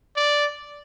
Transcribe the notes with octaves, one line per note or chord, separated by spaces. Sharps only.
D5